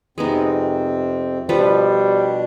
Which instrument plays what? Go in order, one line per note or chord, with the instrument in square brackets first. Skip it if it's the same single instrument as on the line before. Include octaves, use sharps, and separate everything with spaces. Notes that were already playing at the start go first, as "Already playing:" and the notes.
[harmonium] F2 C3 C4 [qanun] G#3 B3 D#4
[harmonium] B2 D4 [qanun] F3 A4 B4 [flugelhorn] G3